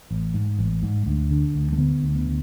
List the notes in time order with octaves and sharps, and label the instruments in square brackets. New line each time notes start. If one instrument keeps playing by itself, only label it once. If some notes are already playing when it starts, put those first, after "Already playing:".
[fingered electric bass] A1
G#2
A1
G#2
D2
D3
D2
A3
D3 B3
D2
B3
D3